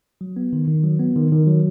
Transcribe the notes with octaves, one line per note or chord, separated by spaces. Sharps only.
F#3
B3
D#3
D#3
F#3
B3
D#3
D#3
F#3